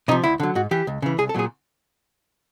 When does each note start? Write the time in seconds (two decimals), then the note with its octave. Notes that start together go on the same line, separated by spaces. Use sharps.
0.08 C3 D#4
0.11 F3
0.24 D2 E4
0.40 D3 F#3
0.55 G#2 F#4
0.71 E3 G4
0.87 C#2
1.02 C#3 E3
1.18 C2 G#4
1.29 A4
1.34 A#2 F#3 G#4